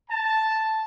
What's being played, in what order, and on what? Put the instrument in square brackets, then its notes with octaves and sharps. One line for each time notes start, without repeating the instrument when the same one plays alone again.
[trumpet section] A5